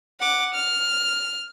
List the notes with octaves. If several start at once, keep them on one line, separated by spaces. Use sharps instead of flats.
F#5 D6
F6